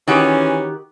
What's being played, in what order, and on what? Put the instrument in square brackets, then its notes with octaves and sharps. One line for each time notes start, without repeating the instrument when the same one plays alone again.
[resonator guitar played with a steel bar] D#3 F#4 G4 [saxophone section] E3 C#4